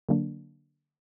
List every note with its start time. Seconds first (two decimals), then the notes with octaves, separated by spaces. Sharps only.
0.09 D3 F#3 A#3 D4